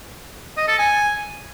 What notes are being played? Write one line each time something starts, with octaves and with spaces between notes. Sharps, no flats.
D#5
A4
G#5